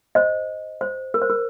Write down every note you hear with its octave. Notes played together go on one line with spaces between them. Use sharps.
C5 D#5
C5
A#4
C5
A#4